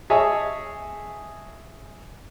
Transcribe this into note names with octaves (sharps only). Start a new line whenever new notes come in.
G#4 C#5 D#5 E5 G#5 A5